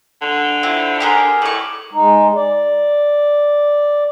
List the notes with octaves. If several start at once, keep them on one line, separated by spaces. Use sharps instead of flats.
D3
C4 E4 F4
G4 G#4 A#4
A2 D5 C#6
G#3 D#4
D5